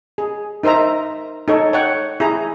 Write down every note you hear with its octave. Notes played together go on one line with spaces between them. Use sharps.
G#4
D#4 A#4 C5 E5 A#5
D#4 A4 C#5
C#5 F#5 G5
E4 G#4 A#5